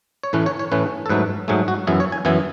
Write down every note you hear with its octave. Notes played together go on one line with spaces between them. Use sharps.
C#5
A2 E3 A3 C#4 B4
C#5
C#5
A2 E3 A3 C#4 B4
A4
G#2 F#3 A3 B4
G#2 F#3 A3 G#4
F#4
F#2 E3 B3 E4 G#4
C#5
G#5
F#2 E3 B3 E4 G#5